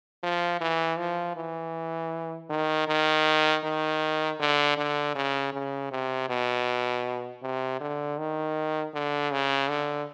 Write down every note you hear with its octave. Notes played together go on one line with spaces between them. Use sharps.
F3
E3
F3
E3
D#3
D#3
D#3
D3
D3
C#3
C#3
C3
B2
C3
D3
D#3
D3
C#3
D3